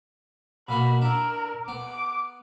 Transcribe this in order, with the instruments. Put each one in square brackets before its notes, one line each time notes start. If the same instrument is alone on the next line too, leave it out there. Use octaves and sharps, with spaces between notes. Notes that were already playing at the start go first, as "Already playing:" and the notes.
[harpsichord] B2 A#3 F#4 [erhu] B5
[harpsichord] D4 E4 [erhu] A#4
[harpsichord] B3 [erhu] D6